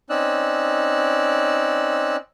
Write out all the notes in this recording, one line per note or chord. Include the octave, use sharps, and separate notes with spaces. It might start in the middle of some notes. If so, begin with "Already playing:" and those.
C4 C#4 D#4 D5 E6 F#6